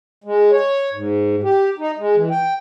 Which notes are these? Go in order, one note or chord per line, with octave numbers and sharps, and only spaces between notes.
G#3
C#5
G#2
G4
D#4
G#3
E3
G5